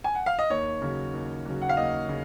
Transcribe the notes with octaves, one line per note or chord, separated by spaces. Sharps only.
G#5
F#5
F5
D#5
D#2 C#5
C#3 F#3
D#2
C#3 F#3
F#5
F5
D#2 D#5
C#3